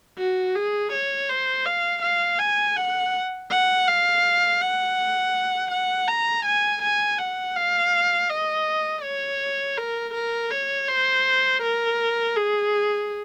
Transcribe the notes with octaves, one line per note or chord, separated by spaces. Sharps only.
F#4
G#4
C#5
C5
F5
F5
G#5
F#5
F#5
F5
F#5
F#5
A#5
G#5
G#5
F#5
F5
D#5
C#5
A#4
A#4
C#5
C5
A#4
G#4